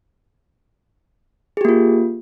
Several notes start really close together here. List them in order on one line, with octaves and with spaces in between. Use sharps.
G#4 G4 A#3 F4